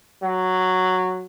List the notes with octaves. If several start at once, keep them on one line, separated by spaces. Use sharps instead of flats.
F#3